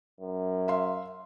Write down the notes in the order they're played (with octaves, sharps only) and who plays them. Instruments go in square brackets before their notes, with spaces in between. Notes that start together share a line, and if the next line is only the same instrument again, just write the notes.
[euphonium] F#2
[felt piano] E5 F5 C6